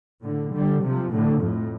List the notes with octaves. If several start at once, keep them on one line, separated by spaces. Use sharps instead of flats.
A2 D3
D3 G3
C3 F3
A2 D3
F2 A2